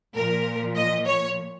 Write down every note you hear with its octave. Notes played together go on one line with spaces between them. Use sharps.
A#2 F3 A#4
D#5
C#5